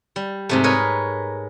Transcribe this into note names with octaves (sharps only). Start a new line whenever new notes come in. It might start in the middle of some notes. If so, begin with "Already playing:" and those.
G3
G#2 C3 A3
A#4 B4 C#5 D#5